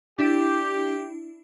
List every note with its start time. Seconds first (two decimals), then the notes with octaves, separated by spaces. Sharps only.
0.19 D4 E4 G4